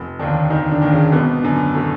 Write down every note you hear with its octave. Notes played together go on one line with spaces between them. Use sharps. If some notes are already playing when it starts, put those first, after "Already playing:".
Already playing: F1
D#2 D3 D#3 D4
F1 D#3 D#4
D3 D4
D#2 D#3
C#3 C#4
G#1 B2 B3
F#2 D3
A2 A3